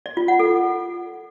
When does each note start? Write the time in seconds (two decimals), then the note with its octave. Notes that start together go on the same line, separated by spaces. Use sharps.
0.06 D5
0.17 F4
0.28 F#5
0.39 A4